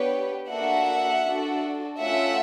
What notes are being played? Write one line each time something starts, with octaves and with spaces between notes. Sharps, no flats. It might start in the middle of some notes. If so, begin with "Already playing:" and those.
Already playing: B3 D4 G4 B4 C#5
A#3 D4 F#4 A4 E5 F#5
D4 F#4 A4
A3 C#4 F4 E5 F#5